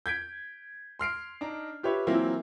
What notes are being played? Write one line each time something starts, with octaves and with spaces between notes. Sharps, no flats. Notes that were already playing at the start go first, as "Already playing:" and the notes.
G6 G#6 B6 D7
C6 F6 C7 D7
D4 D#4 A#5
F4 G4 B4 C#5 E5
E3 F#3 A#3 C4 E4 F4